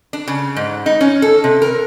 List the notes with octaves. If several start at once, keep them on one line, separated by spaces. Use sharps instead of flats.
D4
C#3
G#2
D#4
C#4
A4
C3
A#4